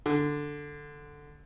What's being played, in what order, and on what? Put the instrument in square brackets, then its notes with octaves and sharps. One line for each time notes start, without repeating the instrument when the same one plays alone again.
[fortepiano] D3